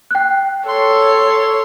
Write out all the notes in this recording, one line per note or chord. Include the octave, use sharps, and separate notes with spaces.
G5 F#6
A4 C#5 C6